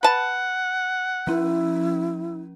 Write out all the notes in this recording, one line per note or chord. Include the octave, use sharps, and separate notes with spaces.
B4 F#5 A5
F3 C#4 E4